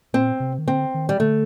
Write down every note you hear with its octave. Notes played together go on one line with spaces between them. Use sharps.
A#2 C4
C3
D#3
D3 C4
D#3
G3
D3 A3